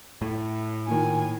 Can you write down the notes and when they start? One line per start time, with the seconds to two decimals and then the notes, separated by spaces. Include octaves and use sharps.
0.22 A2
0.88 A#2 D#3 G#5